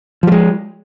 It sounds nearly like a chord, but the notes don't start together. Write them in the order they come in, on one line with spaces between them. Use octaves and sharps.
F3 G3 G#3